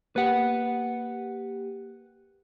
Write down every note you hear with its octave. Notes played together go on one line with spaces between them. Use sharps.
A#3 G4 B4 F#5